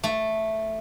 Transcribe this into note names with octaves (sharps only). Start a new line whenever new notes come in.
A3